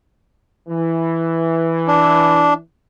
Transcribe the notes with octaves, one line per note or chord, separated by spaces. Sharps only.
E3
D4